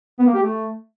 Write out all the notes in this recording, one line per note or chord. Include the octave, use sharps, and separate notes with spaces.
B3
A#3
G4
A3